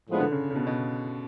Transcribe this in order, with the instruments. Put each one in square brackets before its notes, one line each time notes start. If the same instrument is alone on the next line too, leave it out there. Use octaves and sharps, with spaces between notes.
[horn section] A2 F3 G#3 B3 D4
[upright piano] D3
C#3
C#3
B2
B2